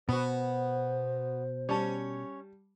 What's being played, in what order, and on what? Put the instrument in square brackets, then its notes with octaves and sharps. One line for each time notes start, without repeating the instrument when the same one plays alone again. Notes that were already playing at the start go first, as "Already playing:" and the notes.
[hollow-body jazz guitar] B2 [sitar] B3 F#4 [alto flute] C5
[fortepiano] G3 A5 [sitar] C#4 C#5